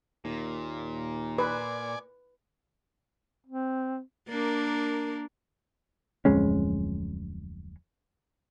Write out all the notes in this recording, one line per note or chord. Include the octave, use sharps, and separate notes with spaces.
D#2 A#2
B4 D5 G#5
C4
A#3 D4 A#4
D1 F2 G#3 C#4